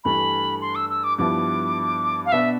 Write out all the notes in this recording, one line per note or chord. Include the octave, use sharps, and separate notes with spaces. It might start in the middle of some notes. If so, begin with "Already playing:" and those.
G2 E3 A3 B5
C6
E6
E6
D6
G2 F3 B3 E4 D6
F5
B2 B3 D4 E5